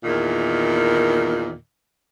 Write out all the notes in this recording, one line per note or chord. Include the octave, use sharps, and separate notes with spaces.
E2 A#2 D#3